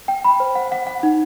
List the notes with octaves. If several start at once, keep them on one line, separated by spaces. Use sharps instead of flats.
G5
B5
C5
F#5
F#5
F#5
D#4